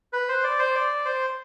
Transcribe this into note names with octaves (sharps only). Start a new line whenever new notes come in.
B4
C5
D5
C5
D5
C5